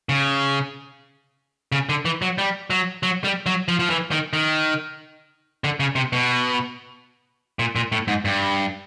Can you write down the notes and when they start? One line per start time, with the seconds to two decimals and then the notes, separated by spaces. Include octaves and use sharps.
0.09 C#3
1.72 C#3
1.89 D3
2.05 E3
2.22 F#3
2.38 G3
2.70 F#3
3.03 F#3
3.24 G3
3.46 F#3
3.68 F3
3.79 F3
3.90 E3
4.11 D#3
4.33 D#3
5.64 D3
5.80 C#3
5.96 C3
6.13 B2
7.59 A#2
7.76 A#2
7.92 A2
8.08 G#2
8.25 G2